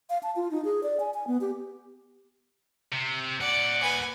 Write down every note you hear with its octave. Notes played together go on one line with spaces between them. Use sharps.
F5
A5
F4
D#4
G#4
D5
G#5
G#5
B3
G4
C3
A#2 D5 F#5
B4 G#5